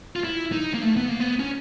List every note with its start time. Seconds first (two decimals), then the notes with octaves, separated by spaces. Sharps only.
0.16 F4
0.24 E4
0.52 D#4
0.74 A#3
0.83 A3
0.96 B3
1.09 A#3
1.20 B3
1.39 C#4